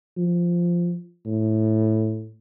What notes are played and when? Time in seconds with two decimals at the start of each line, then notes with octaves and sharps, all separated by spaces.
0.17 F3
1.26 A2